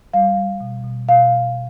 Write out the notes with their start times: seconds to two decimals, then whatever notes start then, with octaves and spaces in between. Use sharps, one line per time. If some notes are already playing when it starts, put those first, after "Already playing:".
0.14 G3 F5
0.37 G3
0.61 B2
0.84 B2
1.08 B2 F5